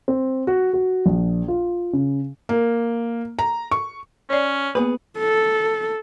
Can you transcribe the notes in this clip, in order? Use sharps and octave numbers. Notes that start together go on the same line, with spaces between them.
C4
F#4
F#4
A#1
F4
C#3
A#3
A#5
C#6
C#4 C#5 D5
A#3 B3 G#4 B4
A4